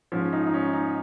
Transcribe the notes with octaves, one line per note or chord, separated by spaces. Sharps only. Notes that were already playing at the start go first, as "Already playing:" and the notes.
G#2 F3 C#4
D#4
D#4
C#4
D#4